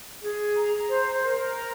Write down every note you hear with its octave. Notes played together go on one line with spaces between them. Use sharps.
G#4
A#5
C5
A#4
A#5